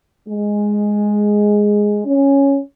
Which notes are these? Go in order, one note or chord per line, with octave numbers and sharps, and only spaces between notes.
G#3
C#4